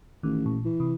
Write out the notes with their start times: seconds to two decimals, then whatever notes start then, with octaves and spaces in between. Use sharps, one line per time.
0.23 A1 D#3
0.46 A#2
0.65 E3
0.80 C3